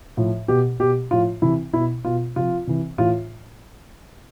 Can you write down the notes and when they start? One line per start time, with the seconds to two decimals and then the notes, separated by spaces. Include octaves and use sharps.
0.17 A2 F3
0.48 B2 G4
0.80 B2 G4
1.11 A2 F3 F4
1.42 C3 E3 E4
1.73 B2 E4
2.05 B2 F4
2.36 C3 F3 F4
2.67 C3 E3
2.98 A2 E3 F4